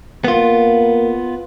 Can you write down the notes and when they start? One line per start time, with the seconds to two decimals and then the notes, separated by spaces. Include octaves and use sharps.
0.25 A#3 B3 F4